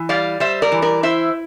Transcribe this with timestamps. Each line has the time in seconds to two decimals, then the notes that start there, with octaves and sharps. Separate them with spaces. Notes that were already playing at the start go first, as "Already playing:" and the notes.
Already playing: E3
0.09 G3 D5 F5
0.40 G3 C5 E5
0.62 A#4 D5
0.72 E3
0.82 A#4 D5
1.03 E4 C5 E5